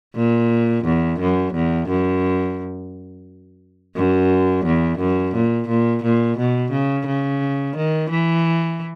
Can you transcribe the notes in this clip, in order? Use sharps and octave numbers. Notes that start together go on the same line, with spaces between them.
A#2
E2
F#2
E2
F#2
F#2
E2
F#2
A#2
A#2
A#2
B2
C#3
C#3
D#3
E3